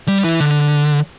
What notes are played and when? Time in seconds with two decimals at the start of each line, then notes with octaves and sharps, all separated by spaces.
0.08 G3
0.24 E3
0.40 D3